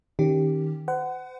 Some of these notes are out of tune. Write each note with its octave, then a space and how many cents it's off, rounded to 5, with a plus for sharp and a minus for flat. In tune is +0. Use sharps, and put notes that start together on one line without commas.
D#3 +0 C#4 -20 G4 +0
C5 -40 F#5 +20